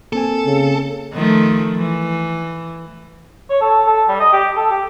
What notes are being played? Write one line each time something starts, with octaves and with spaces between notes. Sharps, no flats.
A#3 C4 A4 G#5
C#3
D#3 F3 A3
E3
C#5
A4
A4
G3
D#5
G4
A4
G4